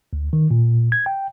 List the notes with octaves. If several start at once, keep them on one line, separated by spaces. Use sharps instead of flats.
D2
D#3
A#2
G#6
G5